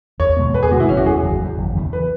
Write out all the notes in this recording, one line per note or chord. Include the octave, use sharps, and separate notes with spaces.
E2 C#5
B2 G#3 B3
E2 B4
G#4
B2 G#3 B3 F#4
E4
F#1 C#4
F#4
E2 E3 G#4
F#1
E2 E3
F#1
E2 C#3 E3
B4